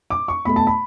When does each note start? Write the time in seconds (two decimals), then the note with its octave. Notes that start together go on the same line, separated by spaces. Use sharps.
0.10 D6
0.28 C#6
0.45 B2 A3 B5
0.56 A5
0.67 B5